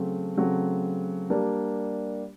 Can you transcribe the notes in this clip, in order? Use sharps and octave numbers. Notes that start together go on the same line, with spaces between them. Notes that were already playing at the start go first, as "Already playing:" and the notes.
Already playing: C#3 F#3 A3 C4
C#3 F#3 A3 C4
G3 A#3 D4